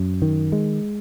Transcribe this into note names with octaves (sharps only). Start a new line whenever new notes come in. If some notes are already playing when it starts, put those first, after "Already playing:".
Already playing: F#2
D#3
G#3